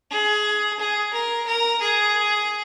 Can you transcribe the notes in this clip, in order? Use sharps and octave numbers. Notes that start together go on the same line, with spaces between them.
G#4
G#4
A#4
A#4
G#4